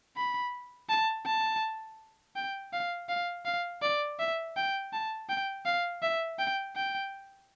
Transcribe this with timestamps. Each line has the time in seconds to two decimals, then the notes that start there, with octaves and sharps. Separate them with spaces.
0.16 B5
0.90 A5
1.26 A5
2.36 G5
2.73 F5
3.09 F5
3.45 F5
3.82 D5
4.19 E5
4.56 G5
4.93 A5
5.29 G5
5.66 F5
6.03 E5
6.39 G5
6.76 G5